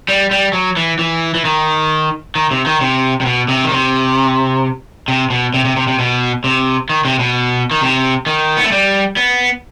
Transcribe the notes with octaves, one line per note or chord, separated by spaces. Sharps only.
G3
G3
F#3
E3
E3
E3
D#3
D#3
C3
D#3
C3
C3
B2
C3
D#3
C3
C3
B2
C3
C3
C3
C3
B2
C3
D#3
C3
B2
D#3
C3
D#3
B3
A3
G3
B3